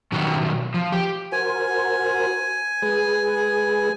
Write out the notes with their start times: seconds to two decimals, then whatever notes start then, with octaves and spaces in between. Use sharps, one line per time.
0.12 B2 D#3 F#3 G3 F#4
0.74 F3
0.92 G4
1.32 F#4 A#4 C5 G#5
2.82 G#3 G#4 B4